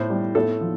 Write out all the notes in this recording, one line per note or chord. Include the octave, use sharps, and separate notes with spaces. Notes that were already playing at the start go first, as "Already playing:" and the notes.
Already playing: A2 C5
G3
A2 A4
F3